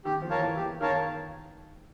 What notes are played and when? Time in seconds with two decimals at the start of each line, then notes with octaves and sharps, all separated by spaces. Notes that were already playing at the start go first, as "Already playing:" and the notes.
0.05 D#3 G4
0.22 F3
0.30 A#4 C#5 F5 A5
0.38 E3
0.56 E3 G4
0.80 D#3 A#4 C#5 F5 A5